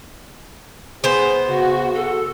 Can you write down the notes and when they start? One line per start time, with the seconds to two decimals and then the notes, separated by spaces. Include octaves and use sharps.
1.04 B3 G#4 C5
1.46 C#3 F#4
1.94 A4